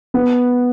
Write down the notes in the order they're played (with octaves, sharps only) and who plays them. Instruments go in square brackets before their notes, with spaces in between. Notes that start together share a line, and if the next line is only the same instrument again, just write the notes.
[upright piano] B3